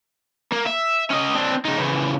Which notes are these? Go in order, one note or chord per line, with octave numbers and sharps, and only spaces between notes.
A#3
E5
C#4 D#5
C4 D4
C#3 D#4
C#3 E3